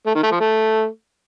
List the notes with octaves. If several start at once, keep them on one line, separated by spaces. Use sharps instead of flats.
A3
D#3
A3
F3
A3